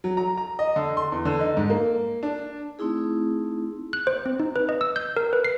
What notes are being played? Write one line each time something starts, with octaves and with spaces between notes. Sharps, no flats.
F#3
A#5
A#5
D#5
D3
C6
E2
D3
D#4
G#2
A#3
D4
A3 C4 D#4 E4 G#4
F#6
C5
C4
D#4
B4
D#5
E6
G6
A#4
B4
C7